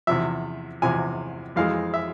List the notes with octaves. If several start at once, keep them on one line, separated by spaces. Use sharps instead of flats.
E2 C3 F3 E5
E2 C3 F3 G#5
F2 E3 G#3 F5
E5